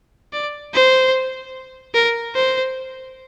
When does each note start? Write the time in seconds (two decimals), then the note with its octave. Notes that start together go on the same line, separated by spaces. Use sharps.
0.33 D5
0.74 C5
1.94 A#4
2.35 C5